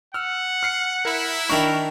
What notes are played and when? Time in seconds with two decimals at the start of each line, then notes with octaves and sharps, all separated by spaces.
0.14 F#5 E6 F6
0.63 F6 C7 C#7
1.05 E4 A#4
1.50 D#3 D4 A#4 C#6